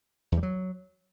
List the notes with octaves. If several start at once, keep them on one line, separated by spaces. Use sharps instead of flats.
E2
G3
F#3